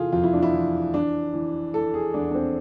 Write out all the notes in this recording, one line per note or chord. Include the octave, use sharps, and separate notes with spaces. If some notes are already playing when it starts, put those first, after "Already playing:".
Already playing: C3 E3 F4 G#4 A4
F2 F4
E4
D4
E4
E3
E3 D4
E3
E3 A4
G#4
E2 D4
D4
C4